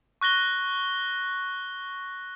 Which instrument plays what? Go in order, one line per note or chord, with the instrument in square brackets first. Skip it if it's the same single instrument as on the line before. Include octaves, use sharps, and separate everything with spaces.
[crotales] C#6 F#6 A#6 G7